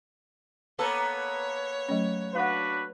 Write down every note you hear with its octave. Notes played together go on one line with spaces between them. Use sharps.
A#3 B3 A4 C#5
F#3 A3 C#4
D4 F#4 B4 F5 F#5